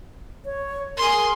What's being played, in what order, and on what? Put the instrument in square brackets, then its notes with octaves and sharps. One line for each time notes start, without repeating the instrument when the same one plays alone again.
[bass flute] C#5
[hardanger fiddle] G#4 C6 [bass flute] A#4